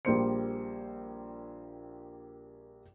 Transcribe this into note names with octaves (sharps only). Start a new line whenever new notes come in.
A#1 G3 A#3 C5 C6 C#7